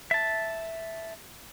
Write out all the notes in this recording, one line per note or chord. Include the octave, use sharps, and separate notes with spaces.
E5 A5